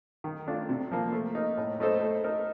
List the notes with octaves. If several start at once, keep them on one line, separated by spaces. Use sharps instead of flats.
D#3
A3 D4 F4
C3
F3 A#3
A3
D#4 A#4
A2
A3 D#4 A4 C5
A3
D#4 A#4